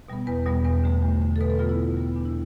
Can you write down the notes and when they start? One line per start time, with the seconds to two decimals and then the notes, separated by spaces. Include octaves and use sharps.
0.08 B2 G3 B3
0.27 E2 B4
0.46 B2 G3 B3
0.65 E2 B4
0.84 D3 A3
1.02 E2
1.22 D3 A3
1.36 A4
1.41 B2 B4
1.50 A4
1.59 G3 B3 F4
1.69 E4
1.78 B2
1.97 G3 B3
2.16 E2 D4
2.26 E4